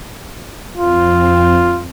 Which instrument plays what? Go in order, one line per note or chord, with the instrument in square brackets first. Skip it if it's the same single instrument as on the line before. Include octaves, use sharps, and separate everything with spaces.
[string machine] F2 C4 [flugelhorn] F4